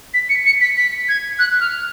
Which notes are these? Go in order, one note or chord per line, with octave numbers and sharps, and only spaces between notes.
B6
C#7
C#7
B6
B6
G#6
F#6
F6